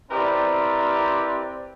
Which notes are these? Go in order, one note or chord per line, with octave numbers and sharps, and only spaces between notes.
C4 E4 G4 A#4 B4 D5